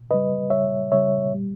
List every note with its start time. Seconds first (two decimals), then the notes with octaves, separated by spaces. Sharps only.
0.11 C#3 G3 B4 D#5
0.50 C#3 G3 C#5 E5
0.92 C#3 G3 C#5 E5
1.32 A#2 G3